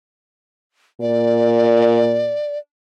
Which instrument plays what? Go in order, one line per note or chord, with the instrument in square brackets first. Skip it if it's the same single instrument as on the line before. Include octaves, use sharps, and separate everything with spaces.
[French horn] A#2 [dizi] D5